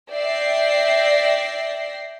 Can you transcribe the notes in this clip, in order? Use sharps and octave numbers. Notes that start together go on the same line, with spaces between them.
D5 E5 G5 A#6 C7